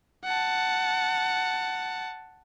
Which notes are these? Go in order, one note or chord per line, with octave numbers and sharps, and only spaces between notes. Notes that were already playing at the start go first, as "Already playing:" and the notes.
F#5 A5